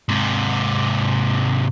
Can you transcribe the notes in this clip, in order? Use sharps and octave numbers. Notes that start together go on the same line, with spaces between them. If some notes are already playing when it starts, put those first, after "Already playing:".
G#2 C3